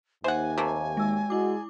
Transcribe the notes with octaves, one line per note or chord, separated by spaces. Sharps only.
D#2 C5 E5 F#5 G#5
C3 A3 A#3
G#3 E6
G#3 E4 F#4 D6